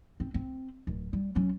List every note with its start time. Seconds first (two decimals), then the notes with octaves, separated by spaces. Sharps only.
0.20 C4
0.34 C4
0.87 D1
1.13 G3
1.35 F#3 C#4